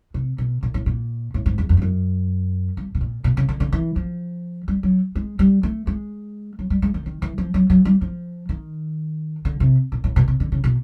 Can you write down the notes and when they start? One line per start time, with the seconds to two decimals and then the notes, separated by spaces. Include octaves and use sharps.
0.14 C3
0.38 B2
0.63 A#2
0.74 A2
0.86 A#2
1.34 A2
1.46 G#2
1.58 E2
1.69 F2
1.77 G2
1.82 F#2
2.77 G2
2.95 B2
3.01 A#2
3.24 B2
3.37 C#3
3.49 D3
3.60 D3
3.72 E3
3.96 F3
4.68 G3
4.83 F#3
5.15 G#3
5.39 G3
5.63 A3
5.87 G#3
6.59 F#3
6.70 G3
6.82 G#3
6.94 D#3
7.06 D#3
7.22 E3
7.38 F3
7.54 F#3
7.70 F#3
7.85 G3
8.02 F3
8.49 D#3
9.45 D3
9.60 C3
9.92 A#2
10.04 A2
10.16 B2
10.28 C3
10.40 D3
10.52 C#3
10.64 B2